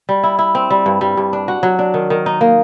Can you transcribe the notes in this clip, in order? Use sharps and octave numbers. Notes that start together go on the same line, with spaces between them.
G3
E4
E4
C4
G3
G2
G3
G2
D4
F#4
F#3
D4
D#3
D#3
D#4
A#3